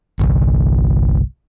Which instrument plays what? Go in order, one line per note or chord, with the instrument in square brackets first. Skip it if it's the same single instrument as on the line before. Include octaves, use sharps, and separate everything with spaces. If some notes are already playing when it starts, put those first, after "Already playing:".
[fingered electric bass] G1 C2